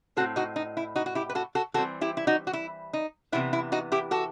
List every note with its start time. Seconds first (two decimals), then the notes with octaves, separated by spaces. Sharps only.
0.17 A2 F#3 C4 F#4 A4
0.36 D#4 F#4
0.56 D#4
0.77 E4
0.96 D#4 F#4
1.06 F#4
1.15 E4 G4
1.29 B4
1.35 F#4 A4
1.55 F#4 A4
1.74 E3 G3 C4 F#4 A4
2.01 E4 G4
2.17 E4
2.27 D#4 F#4
2.47 F#4
2.53 E4
2.93 D#4
3.32 C3 E3 B3 E4
3.53 E4
3.72 D#4 F#4
3.92 E4 G4
4.11 F#4 A4